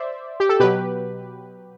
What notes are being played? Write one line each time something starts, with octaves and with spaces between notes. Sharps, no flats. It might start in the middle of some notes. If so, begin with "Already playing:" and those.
Already playing: C5 D5 E5
G4
A4
B2 F#3 G4 B4